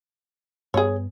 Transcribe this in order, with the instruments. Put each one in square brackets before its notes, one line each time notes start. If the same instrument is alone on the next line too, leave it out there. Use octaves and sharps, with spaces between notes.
[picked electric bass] G2 B3 [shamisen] G#4 C#5